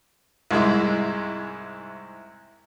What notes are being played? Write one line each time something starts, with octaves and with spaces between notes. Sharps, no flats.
C2 G#2 G#3 E4